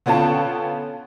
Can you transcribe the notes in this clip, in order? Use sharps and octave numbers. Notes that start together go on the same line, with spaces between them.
D3 B3 C#4 F4 G5 A5